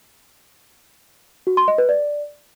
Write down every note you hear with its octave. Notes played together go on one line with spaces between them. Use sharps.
F#4
C6
D#5
B4
D5